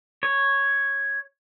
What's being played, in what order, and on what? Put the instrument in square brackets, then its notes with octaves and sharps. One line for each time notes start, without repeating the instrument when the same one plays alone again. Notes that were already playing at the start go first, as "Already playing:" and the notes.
[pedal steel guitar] C#5